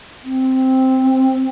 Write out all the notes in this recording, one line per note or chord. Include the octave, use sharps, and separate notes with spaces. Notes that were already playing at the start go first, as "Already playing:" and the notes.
C4